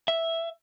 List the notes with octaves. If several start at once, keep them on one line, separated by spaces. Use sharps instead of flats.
E5